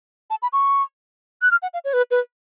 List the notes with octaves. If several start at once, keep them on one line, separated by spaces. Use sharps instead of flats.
A5
B5
C#6
F#6
F6
F#5
F5
C#5
B4
B4